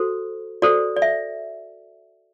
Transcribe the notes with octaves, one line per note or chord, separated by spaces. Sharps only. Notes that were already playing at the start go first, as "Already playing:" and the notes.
Already playing: F#4 A4 C5
F#4 A4 C5 D5
D5
E5